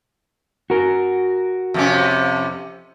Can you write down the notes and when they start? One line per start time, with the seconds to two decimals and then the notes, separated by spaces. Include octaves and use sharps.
0.70 F#4 A#4
1.74 F2 C3 C#4